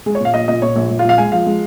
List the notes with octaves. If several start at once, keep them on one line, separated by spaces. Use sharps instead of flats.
G#3 G#4
C#5
A#2 F5
A#1 D#5
A#2 D#5
A#2 C#5
A#1
A#1
F4
A#1 F5
G#3 G#5
F3 F5
G#3